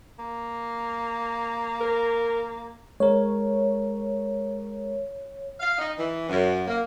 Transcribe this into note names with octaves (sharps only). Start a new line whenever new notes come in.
A#3
A#4
G#3 A#4 C#5
F5
D#4
E3
F#2
A#3